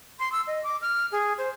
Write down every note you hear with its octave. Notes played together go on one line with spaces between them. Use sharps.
C6
E6
D#5
D6
F6
G#4
C5